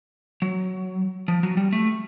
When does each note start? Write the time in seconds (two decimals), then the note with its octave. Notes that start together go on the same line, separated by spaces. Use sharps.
0.42 F#3
1.28 F3
1.43 F#3
1.57 G3
1.73 A3